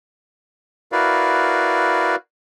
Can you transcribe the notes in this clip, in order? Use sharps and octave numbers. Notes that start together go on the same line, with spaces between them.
E4 F#4 A#4 B4 D5 F5